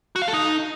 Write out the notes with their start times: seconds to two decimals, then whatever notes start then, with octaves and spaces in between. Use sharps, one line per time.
0.16 F#4
0.22 F5
0.28 A4
0.34 D#4